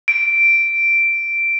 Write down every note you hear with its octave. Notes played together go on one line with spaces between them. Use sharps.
D7